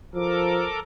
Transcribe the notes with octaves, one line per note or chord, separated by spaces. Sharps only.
F3 A4 A#4 D6